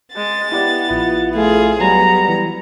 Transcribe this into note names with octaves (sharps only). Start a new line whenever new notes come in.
G#3 A6
B3 E4 G4 D5
A#1 E4 F4
A3 F4 G#4
F#3 G3 B3 A#5
E3